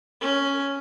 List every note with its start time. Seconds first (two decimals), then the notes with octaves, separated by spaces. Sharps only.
0.22 C#4